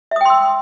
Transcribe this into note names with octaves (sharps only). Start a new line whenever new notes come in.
E5 G5 C6 D#6 E6